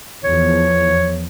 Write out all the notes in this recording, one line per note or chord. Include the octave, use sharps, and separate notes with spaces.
E2 F3 C#5